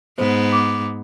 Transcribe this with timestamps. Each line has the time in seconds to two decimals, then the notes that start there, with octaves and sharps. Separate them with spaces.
0.18 G#2 B3 C5
0.53 D6